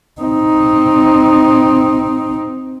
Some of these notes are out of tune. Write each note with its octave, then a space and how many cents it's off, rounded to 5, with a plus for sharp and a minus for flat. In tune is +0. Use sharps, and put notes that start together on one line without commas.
C4 +0 D#4 +0